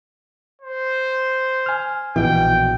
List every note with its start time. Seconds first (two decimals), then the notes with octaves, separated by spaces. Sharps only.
0.62 C5
1.66 G#5 F6
2.16 A#1 B2 E3 G5